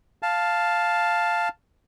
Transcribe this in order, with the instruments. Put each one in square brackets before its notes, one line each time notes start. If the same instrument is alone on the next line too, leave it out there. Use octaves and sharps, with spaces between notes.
[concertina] F5 A5